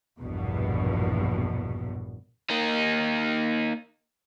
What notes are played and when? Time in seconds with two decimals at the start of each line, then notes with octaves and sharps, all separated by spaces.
0.21 A#1 E2 G2 B2
2.50 A#3 D#4